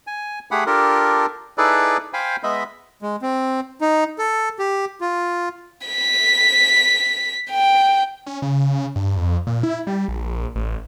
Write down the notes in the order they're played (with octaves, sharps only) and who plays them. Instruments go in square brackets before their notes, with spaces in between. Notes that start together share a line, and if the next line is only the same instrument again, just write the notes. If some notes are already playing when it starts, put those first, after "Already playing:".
[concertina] G#5
A3 G4 G#4 F#5 B5
D4 F4 G4 A4 A#4
D#4 E4 G#4 A4 B4 D5
C5 F5 G5 G#5 B5
G#3 B3 D#5 E5 B5
[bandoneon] G#3
C4
D#4
A4
G4
F4
[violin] B6
G5
[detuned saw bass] C#4
C#3
G2
F2
A#2
E4
G3
A#1
A1